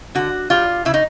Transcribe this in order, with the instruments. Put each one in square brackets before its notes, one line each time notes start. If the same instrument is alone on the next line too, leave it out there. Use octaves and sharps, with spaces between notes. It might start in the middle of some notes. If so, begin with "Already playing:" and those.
[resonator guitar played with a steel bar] D3 F#4
G3 F4
C#3 E4
D#4